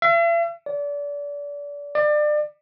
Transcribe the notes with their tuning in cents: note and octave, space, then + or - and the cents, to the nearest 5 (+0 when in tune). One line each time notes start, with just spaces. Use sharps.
E5 +45
D5 -30
D5 +30